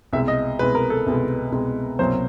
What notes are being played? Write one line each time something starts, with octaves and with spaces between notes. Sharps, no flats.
C2 B2 G#3 E5
D#5
C2 B2 G#3 B4
A#4
A4
C2 B2 G#3
C2 B2 G#3
C2 B2 F#3 A#3 C5